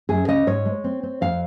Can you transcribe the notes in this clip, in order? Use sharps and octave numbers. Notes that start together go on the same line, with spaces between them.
F#2 G#4
C#3 D#5
G#2 C#5
G#3
C4
C4
F2 F5